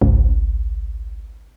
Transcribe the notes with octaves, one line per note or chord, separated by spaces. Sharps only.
G#1 C#2